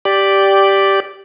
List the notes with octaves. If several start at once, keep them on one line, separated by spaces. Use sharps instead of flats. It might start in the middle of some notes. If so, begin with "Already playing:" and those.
G4 D5